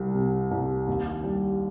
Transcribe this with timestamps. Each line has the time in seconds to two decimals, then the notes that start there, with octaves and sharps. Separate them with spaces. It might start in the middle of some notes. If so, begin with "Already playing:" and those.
Already playing: C2 G3
0.15 C3
0.51 C2
0.87 D#2
1.24 G3